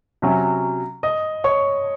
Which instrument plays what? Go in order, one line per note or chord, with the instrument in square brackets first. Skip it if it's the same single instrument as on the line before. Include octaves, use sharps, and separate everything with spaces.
[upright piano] C3 F#3 C#4 F#4
[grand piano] D#5 D#6
C#5 C#6